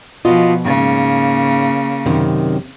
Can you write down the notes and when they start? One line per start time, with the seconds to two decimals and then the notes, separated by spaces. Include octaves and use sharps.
0.25 B2 F3 F4 D#5
0.65 G#2 C#3 A#3
2.06 F#2 C3 D#3